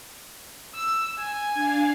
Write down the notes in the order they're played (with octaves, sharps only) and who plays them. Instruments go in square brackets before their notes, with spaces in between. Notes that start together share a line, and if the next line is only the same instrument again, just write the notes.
[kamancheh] E6
G#5
[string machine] D4 F5